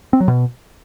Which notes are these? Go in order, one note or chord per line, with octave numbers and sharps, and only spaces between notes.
C4
F#3
B2